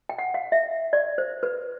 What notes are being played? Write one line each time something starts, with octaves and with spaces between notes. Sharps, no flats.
G5
F#5
F5
E5
D5
C5
B4